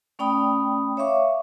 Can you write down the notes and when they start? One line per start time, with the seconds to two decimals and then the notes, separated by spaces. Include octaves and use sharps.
0.19 A3 C#4 D5 G5 B5 D#6
0.97 C#5 E5 F5 C#6 D6